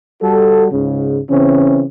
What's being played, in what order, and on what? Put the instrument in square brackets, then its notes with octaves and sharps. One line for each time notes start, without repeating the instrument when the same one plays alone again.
[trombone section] G3 F#4 A4
C#2 G#2 C#3
C#3 E3 C4 C#4